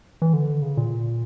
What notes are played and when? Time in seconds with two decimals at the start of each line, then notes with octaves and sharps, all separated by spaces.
0.22 E3
0.33 D3
0.62 C#3
0.77 A#2